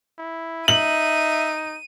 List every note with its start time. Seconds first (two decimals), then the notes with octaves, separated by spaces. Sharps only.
0.18 E4
0.68 D#4 E5 D#7 F#7